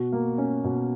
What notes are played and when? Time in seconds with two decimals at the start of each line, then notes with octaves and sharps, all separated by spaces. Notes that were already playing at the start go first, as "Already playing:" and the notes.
Already playing: B2 F#4
0.12 A#3
0.38 C#4
0.64 B2